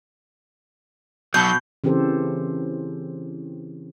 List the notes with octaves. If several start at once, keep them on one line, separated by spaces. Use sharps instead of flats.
B1 B2 F#3 G6
C#3 E3 C4 G4 A4 C5